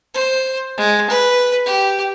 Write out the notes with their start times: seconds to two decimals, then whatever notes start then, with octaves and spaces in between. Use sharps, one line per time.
0.14 C5
0.77 G#3
1.10 B4
1.66 G4